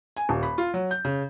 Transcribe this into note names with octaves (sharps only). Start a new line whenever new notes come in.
G#5
D#1
B5
F4
F#3
G6
C#3